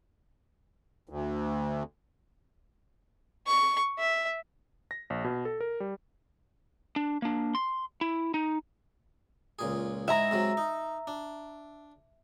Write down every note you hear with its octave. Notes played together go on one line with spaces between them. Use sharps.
D2
C#6
E5
A#6
A#1
B2
A4
A#4
G3
D4
A#3 D4
C6
E4
D#4
C#2 A#2 G#4
G#2 G#3 E4 E5 A#5
G#2 C3 F#3
D#4
D4